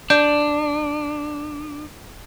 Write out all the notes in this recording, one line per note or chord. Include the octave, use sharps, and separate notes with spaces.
D4 D5 G6